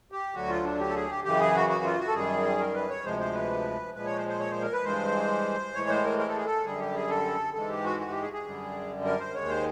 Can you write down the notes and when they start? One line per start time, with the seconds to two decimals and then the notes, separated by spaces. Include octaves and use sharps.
0.12 G4
0.34 D2 D3 F#3 F#4
0.49 F4
0.64 D4
0.79 G4
0.89 A4
0.95 G#4
1.09 G4
1.24 F#2 C#3 E3 G4
1.40 G#4
1.55 F#4
1.69 F#4
1.84 F4
1.99 F#4
2.08 A4
2.14 F#2 D#3 G3 G#4
2.60 A#4
2.74 B4
2.89 C#5
3.04 D2 C3 F3 G#3 C5
3.19 C5
3.34 B4
3.94 A#2 F3 G#3 B4
4.05 C#5
4.17 C5
4.28 C5
4.40 C#5
4.51 C5
4.62 A#4
4.73 B4
4.84 G2 E3 G#3 C5
5.74 A2 E3 G#3 C#5
5.89 C5
6.04 A#4
6.19 A#4
6.28 A4
6.37 G#4
6.45 A4
6.65 F#2 D3 G3 G#4
6.79 G4
6.95 G#4
7.09 A4
7.54 G#2 E3 G#3 A4
7.69 G4
7.84 F#4
8.00 F#4
8.11 G4
8.22 G#4
8.33 G#4
8.44 F#2 D3 G3
9.05 A#4
9.19 C5
9.34 D#2 D#3 G#3 C#5
9.49 C5